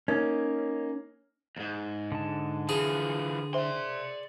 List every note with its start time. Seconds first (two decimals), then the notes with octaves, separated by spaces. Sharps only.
0.08 A#3 C#4 D#4
1.56 D#2 G#2
2.12 D3 A5
2.69 E3 F3 G#4
3.54 C5 D5 E5 C6